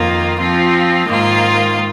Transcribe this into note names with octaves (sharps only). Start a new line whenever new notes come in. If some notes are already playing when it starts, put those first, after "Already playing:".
Already playing: F2 D#3 A#3 F4
F3 C4 F4
G#2 D#3 A#3 F4